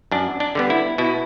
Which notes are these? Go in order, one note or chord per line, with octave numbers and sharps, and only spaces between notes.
F#2 D4
D4
D3 G3 B3
E4
B2 E4